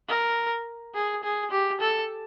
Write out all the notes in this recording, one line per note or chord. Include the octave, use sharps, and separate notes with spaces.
A#4
G#4
G#4
G4
A4